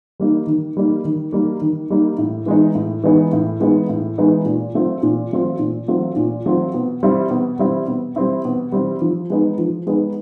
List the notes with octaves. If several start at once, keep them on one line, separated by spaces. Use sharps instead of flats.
G3 A#3 D#4
D#3
G3 A#3 D#4
D#3
G3 A#3 D#4
D#3
G3 A#3 D#4
A2
E3 G#3 B3 D#4
A2
E3 G#3 B3 D#4
A2
E3 G#3 B3 D#4
A2
E3 G#3 B3 D#4
A#2
F#3 A3 C4 F4
A#2
F#3 A3 C4 F4
A#2
F#3 A3 C4 F4
A#2
F#3 A3 C4 F4
B2
G3 C4 E4
B2
G3 C4 E4
B2
G3 C4 E4
B2
G3 C4 E4
F3
G#3 B3 D#4
F3
G#3 B3 D#4